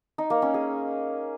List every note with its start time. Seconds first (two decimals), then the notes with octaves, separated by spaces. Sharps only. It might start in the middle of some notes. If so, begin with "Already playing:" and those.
0.18 D#4
0.30 A#3
0.42 C#4
0.54 G#4